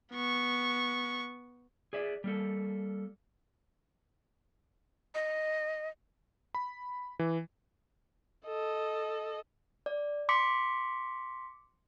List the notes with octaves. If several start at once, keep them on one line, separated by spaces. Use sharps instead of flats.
B3 C#6
G#4 D5 E5
G3 A#3 A4
D#5
B5
E3
A4 D#5
D5
C6 D6 B6 C#7